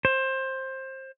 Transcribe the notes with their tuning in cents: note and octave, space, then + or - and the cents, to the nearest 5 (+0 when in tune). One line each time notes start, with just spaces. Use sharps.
C5 +20